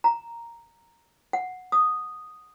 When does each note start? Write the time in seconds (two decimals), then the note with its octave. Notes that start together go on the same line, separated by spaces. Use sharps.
0.04 A#5
1.33 F#5
1.72 D#6